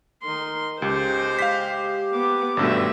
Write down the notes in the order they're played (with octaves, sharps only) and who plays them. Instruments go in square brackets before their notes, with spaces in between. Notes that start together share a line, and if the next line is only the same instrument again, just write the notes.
[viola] D#3 C6
[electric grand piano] C#2 [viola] G#3 C5 [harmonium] G4
[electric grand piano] F5 B6
[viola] B3 D6
[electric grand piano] G#1 G2 B2 [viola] A3 E5